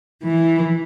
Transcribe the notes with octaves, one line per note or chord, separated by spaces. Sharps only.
E3